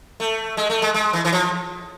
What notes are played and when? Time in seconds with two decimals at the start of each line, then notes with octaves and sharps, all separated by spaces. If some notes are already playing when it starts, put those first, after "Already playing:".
0.20 A3
0.57 G#3
0.70 A3
0.82 G#3
0.94 G#3
1.13 E3
1.25 E3
1.33 F3